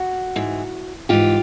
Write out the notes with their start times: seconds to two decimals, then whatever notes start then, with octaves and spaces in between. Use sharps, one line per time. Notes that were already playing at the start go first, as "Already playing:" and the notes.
Already playing: F#4
0.36 G#2 E3
1.09 G#2 E3 F4 G4